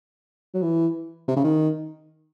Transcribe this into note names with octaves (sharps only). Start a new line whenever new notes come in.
F#3
E3
C3
C#3
D#3